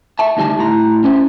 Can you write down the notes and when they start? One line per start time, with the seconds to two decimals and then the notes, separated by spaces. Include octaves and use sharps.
0.19 E5 A5
0.37 D2 D#3 G3 G#5 A5
0.59 A2 A#5
1.04 C#4 E4 C5